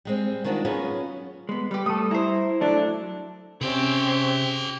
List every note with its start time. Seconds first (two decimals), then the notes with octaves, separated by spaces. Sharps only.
0.05 G3 G#3 C4
0.44 D#3 G#3 D4 F4 F#4
0.65 F#3 B3 C#4 F4 G#4
1.49 G#3 B3
1.71 G3 G4 B4
1.86 A3 A4 D#6
2.11 E4 C5 A#5
2.61 F#3 A3 D4
3.61 C3 C4 C#4 G#4 G5